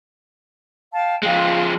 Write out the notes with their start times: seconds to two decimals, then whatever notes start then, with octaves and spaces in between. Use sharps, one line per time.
0.92 F5 G5 A5
1.23 F3 G#3 F4 G4